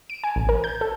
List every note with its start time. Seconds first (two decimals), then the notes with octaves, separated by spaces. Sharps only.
0.10 D7
0.24 G#5
0.36 A1
0.49 A#4
0.64 G6
0.81 A4